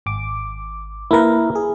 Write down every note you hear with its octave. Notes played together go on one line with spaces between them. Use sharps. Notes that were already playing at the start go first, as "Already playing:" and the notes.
G#1 D6
A#3 E4 A#4 B4
G#4